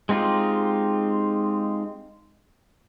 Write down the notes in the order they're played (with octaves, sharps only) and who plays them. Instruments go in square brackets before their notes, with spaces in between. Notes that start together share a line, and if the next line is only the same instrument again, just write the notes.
[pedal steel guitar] G#3 C4 D#4 F4 G4